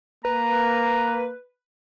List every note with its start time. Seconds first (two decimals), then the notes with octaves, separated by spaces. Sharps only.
0.25 A#3 B4 A#5